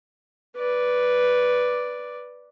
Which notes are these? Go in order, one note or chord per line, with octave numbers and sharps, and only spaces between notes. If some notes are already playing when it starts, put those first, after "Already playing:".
B4 D5